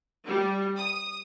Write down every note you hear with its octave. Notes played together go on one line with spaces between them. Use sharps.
G3
D#6